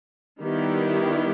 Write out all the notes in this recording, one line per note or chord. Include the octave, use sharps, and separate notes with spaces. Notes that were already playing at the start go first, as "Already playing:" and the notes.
D#3 G3 B3 E4 G4